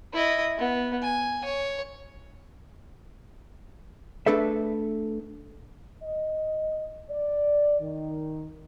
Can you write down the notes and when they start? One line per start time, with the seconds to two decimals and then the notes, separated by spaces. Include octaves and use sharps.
0.13 E4 D#5
0.58 B3
1.02 G#5
1.44 C#5
4.26 A3 D4 G#4 A4 B4 E5
6.03 D#5
7.09 D5
7.80 D#3